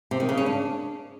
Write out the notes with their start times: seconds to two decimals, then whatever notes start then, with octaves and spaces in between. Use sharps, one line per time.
0.11 C3
0.20 D#3
0.29 C#3
0.37 C#4
0.46 D4